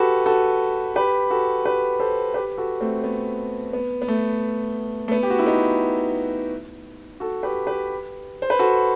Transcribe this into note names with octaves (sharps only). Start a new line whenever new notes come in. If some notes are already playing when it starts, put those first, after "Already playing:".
Already playing: F#4 G4 A4 B4
F#4 A4
G4 B4
F#4 A4
G4 B4
A4 C5
G4 B4
F#4 A4
A3 C4
B3
B3
B3
A3
A3
B3
G4
F#4
E4
B3 D#4
F#4 A4
G4 B4
G4 B4
C5
B4
F#4 A4